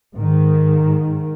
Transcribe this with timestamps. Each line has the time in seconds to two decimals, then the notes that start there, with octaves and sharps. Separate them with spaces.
0.15 G#2 D#3